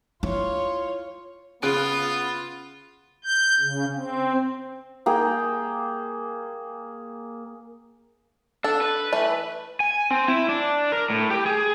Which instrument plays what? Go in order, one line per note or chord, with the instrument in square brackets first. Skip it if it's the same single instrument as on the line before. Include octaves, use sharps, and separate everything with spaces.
[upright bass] E4 [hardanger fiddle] F4 C#5
[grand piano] C#3 F#6 D7 [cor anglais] B3 [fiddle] F4
[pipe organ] G6
C#3
C4
[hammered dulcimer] A#3 G#4 G5
[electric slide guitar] D4 [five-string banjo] A4
[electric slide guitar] B4
[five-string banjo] E3 A3
[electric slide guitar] G#5
C4
E4
D4
A#4
A2
G4
G#4